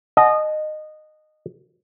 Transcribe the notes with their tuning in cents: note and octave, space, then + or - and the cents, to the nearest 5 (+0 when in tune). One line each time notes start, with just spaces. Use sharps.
D#5 -15 F#5 +0 A5 -40